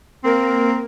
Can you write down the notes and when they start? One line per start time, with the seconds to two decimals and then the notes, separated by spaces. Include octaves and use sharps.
0.24 A#3 C4 A#4